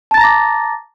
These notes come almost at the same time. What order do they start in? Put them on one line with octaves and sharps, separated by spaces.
A5 A6 A#5 A#6 D6